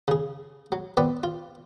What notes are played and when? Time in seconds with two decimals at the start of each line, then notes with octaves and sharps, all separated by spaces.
0.08 C#3 G#4
0.72 F#3
0.97 B3 C4 B4 D5
1.23 F4